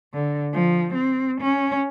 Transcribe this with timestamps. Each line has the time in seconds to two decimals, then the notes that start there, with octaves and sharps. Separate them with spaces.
0.14 D3
0.53 F3
0.94 C4
1.41 C#4